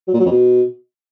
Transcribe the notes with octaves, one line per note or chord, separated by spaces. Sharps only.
F#3
A#2
F#3
F2
B2